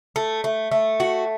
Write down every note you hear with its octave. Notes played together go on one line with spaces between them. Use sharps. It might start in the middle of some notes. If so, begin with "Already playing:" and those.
A3
A3
A3
F#4